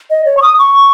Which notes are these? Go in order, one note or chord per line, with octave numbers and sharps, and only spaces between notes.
D#5
C#5
C#6
D#6
C#6